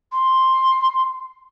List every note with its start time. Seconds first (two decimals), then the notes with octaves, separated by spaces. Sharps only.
0.12 C6